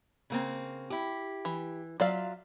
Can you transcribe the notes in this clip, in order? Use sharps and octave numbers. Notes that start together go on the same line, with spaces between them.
C#3 A#3 C4
E4 G4
E3
F#3 F4 D5 E5 F5